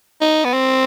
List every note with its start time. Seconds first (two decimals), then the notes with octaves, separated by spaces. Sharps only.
0.21 D#4
0.44 B3
0.53 C4